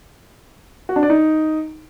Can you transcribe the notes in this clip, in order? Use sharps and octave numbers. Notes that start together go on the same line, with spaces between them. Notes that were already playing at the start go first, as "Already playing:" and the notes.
F#4
D4
D5
D#4